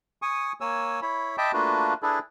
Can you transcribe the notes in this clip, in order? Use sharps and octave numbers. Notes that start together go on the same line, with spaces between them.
G#5 C#6 D#6
A#3 C#5 G#5 E6
E4 C#5 B5
D#5 E5 G5 A5 B5 D6
A3 A#3 D4 F4 F#4 B4
D4 E4 G#4 A4 B4